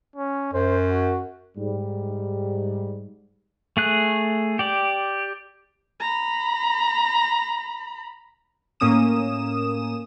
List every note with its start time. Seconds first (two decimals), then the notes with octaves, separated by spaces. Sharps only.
0.16 C#4
0.53 F#2 C5
0.88 F#4
1.58 G#2 G3
3.77 A3 G#4 F#6
4.59 G4 D5
6.00 A#5 B5
8.80 A2 A#3 C#4 D#6 E7